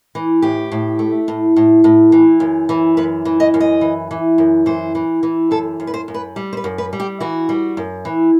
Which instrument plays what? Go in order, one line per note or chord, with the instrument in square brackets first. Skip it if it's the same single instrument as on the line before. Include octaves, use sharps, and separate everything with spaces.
[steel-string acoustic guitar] E3
A2 G4
A2
A3
A2
A2
A2
E3
F#2
E3
F#2 B4
E3
D#5
F#2
D#5
E3
E3
F#2
E3 C5
E3
E3
F#2 A4
F#2
B4
C5
F#2
B4
G3
C5
B4
F#2
B4
G3
G4
E3 F#4
G3
F#2
E3